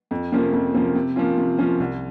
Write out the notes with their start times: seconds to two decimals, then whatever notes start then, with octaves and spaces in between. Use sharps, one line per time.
0.11 F2
0.32 C3 F3 A#3 C#4
0.53 F2
0.74 C3 F3 A#3 C#4
0.95 C3
1.16 F3 A#3 C#4 F4
1.37 C3
1.59 F3 A#3 C#4 F4
1.80 C2